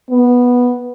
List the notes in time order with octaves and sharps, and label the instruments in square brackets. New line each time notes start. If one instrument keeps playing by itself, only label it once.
[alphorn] B3